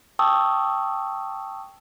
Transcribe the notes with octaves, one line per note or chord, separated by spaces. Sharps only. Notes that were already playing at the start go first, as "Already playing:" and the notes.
G5 A5 C#6 D#6 E6